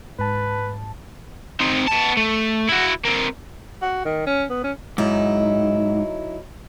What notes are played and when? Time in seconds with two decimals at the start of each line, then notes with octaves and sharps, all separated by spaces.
0.19 G#2 B4 A5
1.61 C4 D#4
1.88 B3 A5
2.17 A3
2.68 E4 F#4
3.05 A#3 C4
3.82 F#4
4.05 D#3
4.27 C#4
4.50 B3
4.64 C#4
4.98 G#2 F#3 D#4 E4